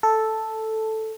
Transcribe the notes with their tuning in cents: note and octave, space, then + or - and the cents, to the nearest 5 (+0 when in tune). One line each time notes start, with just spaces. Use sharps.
A4 +0